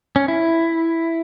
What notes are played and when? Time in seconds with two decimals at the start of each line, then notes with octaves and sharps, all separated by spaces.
0.16 C#4
0.28 E4